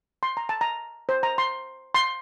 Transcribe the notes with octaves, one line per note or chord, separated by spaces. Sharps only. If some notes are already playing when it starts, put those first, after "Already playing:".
C6
A#5
A5
A#5
C5
A#5
C6
C6